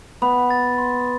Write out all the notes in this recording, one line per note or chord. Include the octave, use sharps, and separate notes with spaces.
B3 B5
A6
C6